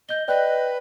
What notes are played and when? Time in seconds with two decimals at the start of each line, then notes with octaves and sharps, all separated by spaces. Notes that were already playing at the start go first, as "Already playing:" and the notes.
0.09 D#5 G6 G7
0.28 B4 D5 D#5 G5 F#6